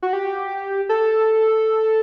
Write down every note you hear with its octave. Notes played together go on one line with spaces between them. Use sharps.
F#4
G4
A4